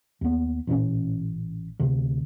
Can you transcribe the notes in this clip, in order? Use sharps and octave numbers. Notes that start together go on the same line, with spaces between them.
D#2 B3
A1 G2 A#2 C#4
D2 C3